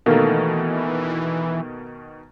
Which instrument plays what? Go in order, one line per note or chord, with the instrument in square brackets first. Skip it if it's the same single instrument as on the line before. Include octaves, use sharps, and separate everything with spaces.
[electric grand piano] B2 D#3 [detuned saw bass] E3 [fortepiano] A3 A#3